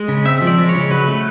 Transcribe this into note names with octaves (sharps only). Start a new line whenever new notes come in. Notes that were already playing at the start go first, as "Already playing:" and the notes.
Already playing: G#3 D#5
C#3
C4 E5
F3
D5
G#3
C#5
C#3
F#3 B4
A3